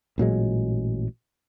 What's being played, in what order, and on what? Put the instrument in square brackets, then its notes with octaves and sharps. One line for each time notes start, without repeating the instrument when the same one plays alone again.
[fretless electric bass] A1 A#2 F#3 G#3